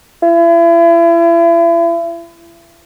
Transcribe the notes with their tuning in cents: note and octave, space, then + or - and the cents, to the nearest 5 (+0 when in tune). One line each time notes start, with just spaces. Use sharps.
E4 +35